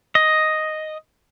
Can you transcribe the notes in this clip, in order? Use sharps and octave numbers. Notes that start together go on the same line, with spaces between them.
D#5